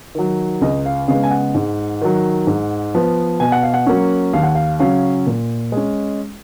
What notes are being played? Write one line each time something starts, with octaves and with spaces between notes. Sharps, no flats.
D#3 F#3
C#2 D#5
F5
C#3 G#3 B3 F5
G#5
F#5
G#2
D#3 F#3
G#2
F3 B3
B2 G#5
F#5
F5
F#5
F#3 A#3 C#4
D#2 F5
F#5
F5
C#3 F#3 C#4 F5
A#2
G#3 C#4